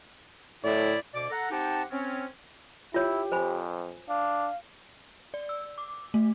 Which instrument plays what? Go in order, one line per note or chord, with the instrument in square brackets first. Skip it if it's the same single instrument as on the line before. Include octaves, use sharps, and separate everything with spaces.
[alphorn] A2 [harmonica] E4 D5
[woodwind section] D2 B2 D5 D6
A4 F#5 A#5
C4 D#4 G4 F#5 G5 A5
C4 C#4
[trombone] E4 [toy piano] F4 C#5 [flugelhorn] G4
[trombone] F2 [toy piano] C5 G#5 B5
[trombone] D4 [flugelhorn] F5
[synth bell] D5
E6
D6
A3